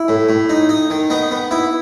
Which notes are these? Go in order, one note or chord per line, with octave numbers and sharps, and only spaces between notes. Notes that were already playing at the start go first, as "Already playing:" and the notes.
Already playing: E4
A2
A2
D#4
D#4
D#3
B3 D#4
B3
B3 E4